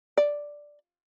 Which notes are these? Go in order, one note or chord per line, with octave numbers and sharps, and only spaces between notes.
D5